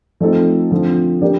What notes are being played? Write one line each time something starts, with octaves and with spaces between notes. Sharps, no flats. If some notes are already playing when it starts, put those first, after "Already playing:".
F3 A3 C4 D#4 A4
D3 F3 C4
F3 A#3 D4 G4 D5